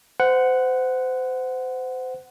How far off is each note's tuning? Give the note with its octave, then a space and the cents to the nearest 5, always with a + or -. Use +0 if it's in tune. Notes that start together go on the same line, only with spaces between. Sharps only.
C5 -30 F#5 +0